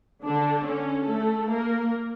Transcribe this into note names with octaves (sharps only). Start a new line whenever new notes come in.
D3 D4
C#4
A3 A4
A#3 A#4